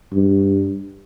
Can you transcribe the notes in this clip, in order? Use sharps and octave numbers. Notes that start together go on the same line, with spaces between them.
G2